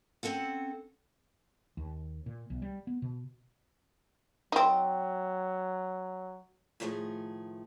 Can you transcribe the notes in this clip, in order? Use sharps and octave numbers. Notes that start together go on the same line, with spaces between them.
C4 C#4 A4 F#5
D#2
A#2
B1
G3
B3
B2
F#3 C4 D#4
A2 D#3 F3 A3 G#4